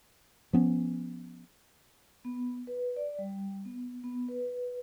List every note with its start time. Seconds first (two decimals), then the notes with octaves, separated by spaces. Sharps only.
0.53 F3 B3 C#4
2.25 B3
2.67 B4
2.96 D5
3.19 G3
3.65 B3
4.04 B3
4.28 B4